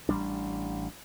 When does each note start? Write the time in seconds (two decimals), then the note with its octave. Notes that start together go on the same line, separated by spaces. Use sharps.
0.09 A1 G3 D4